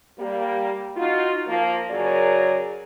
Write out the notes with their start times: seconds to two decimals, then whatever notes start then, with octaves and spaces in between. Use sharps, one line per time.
0.19 G3 A#3
0.97 D#4 F4 F#4
1.47 F3 A#3
1.90 F#2 C#3 F#3 G#4 A#4 D5